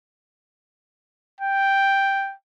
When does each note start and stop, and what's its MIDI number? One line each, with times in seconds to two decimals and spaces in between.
1.41 2.34 79